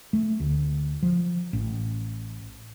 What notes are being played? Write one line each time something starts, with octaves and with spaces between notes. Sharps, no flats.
A3
D2
F3
A1